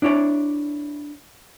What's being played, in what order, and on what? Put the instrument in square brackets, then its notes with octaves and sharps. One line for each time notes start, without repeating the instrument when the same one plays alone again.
[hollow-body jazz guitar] D4 E4 C#5 D5